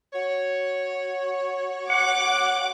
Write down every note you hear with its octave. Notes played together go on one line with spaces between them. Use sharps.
F#4 C#5
F#5 D6 F#6